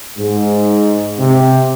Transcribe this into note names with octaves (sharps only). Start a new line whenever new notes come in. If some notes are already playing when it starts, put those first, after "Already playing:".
G#2
C3